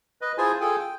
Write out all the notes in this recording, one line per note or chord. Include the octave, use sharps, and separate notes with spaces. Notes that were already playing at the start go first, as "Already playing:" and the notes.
B4 D#5
E4 F4 G#4 C5 G#5 A5
F4 G#4 A4 G5 G#5
G5